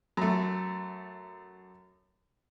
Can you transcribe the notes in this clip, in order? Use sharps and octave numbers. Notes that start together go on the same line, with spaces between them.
F#2 A3